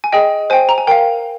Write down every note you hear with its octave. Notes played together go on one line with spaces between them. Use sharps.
G#5
G#4 D#5 G5
C5 G5 G#5
A#5
G#5
A#4 F5 G5